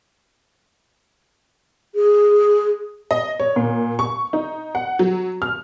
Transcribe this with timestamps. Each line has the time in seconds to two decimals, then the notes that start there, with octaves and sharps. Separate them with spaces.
1.95 G#4
3.11 D#5
3.40 C#5
3.56 A#2
3.99 C#6
4.33 D#4
4.75 F#5
4.99 F#3
5.42 F6